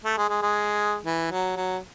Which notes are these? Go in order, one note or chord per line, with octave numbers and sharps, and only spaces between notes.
A3
G#3
G#3
G#3
E3
F#3
F#3